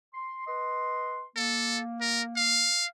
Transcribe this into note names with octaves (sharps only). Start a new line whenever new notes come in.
C6
B4 D#5 C6
A#3 A4
A#4
F5